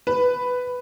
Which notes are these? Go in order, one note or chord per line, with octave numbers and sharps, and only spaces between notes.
B4